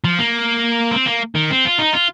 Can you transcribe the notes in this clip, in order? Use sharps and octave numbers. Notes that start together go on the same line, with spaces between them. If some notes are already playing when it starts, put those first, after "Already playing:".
F3
A#3
C4
A#3
D#3
C4
F4
D#4
F4